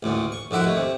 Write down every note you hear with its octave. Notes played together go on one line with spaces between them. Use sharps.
A1 D2 A#2
C#6
A#1 D3 E4 F#4
D#2 A3
C3